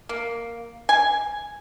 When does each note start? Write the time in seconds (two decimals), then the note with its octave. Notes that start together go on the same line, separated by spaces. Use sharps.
0.09 A#3
0.89 G#5